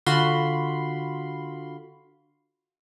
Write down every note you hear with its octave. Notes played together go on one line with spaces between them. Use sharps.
D3 F4 F#4 B5 C6